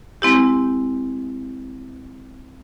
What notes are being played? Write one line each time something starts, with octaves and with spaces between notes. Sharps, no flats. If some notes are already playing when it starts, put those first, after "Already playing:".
G#3 C4 E4 G4